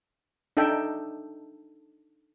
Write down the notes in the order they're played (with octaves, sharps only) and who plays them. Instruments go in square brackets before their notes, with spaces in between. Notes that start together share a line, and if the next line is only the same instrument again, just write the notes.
[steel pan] D4 D#4 A4 E5 G5